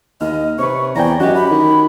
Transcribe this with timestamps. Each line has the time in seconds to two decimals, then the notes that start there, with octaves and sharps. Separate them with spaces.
0.21 D#2 D#5 F6
0.58 C3 B4 C#5 C#6
0.96 E2 D5 G5 G#5 A#5
1.20 F#2 F#4 G4 D#5
1.35 B5
1.51 D#3